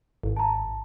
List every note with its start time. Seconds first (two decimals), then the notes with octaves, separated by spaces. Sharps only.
0.23 G#1
0.36 A5 A#5